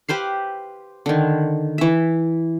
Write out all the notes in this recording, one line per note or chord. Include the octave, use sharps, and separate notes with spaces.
G4 B4 C5 F5
D3 D#3
E3 E5